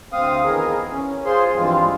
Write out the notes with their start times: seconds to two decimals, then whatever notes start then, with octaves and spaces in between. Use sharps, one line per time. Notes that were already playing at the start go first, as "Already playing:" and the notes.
0.13 D2 C4 F5 D#6
0.44 D#3 E3 B3 G#4 A#4
0.92 C#4
1.25 F4 G#4 C5 C6
1.55 G2 E3 F3 G#3 C4 F4